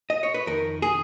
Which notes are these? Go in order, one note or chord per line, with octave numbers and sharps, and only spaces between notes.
D#5
C#5
B4
F2 D#3 A#4
G#4